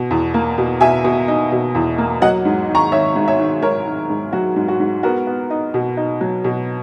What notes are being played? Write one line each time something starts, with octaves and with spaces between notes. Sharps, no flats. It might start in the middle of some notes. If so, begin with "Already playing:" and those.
Already playing: B2
E2
A#3
B2
B2 E5 G#5
B2
D#4
B2
E2
A#3
F#3 D#5 F#5
G#2
D#3
A#5 C#6
D#3 C#5 E5
G#2
C#5 E5
D#3
G#2 A#4 C#5
D#3
G#2
F#3 F#4
G#2
F#4
G#2
B3 F#4 A#4
B3
D#4
B2
D#4
F#3
B2